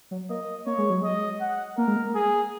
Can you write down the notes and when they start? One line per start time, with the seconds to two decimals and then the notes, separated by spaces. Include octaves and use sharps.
0.11 F#3
0.29 A#3 D#5
0.66 A#3 C#5
0.78 G#3
0.90 F#3
1.02 G#3 D#5
1.40 F#5
1.78 A#3 A#4
1.88 G#3
1.96 A#3
2.15 G#4